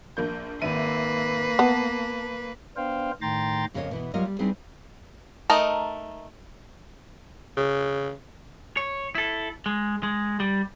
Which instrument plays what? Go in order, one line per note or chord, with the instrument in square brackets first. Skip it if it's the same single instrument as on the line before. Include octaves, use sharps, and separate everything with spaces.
[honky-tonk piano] A#1 A#3 G6
[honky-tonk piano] G#1 E5 D#7 [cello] A#3 B4
[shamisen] B3 [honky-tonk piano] A5
[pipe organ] B3 D4 C5 F5 G5
A2 D#3 G5 A#5 C6 A6
[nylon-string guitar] F2 C#3 A#3 C4 C#5 D#5
B2 E3 B3
F#3 G3 A#3 F4 A#4 D#5
G3
G3 C4 D#4 E4 G#4 B4
[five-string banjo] A3 D#4 A#4 D#5
[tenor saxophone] C#3
[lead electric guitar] C#5
E4 A4
G#3
G#3
G3